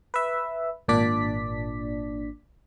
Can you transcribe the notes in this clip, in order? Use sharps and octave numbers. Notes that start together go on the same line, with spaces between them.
B4 E5
G#1 A#2 D4 D5 B6